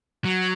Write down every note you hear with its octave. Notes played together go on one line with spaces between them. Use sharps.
F#3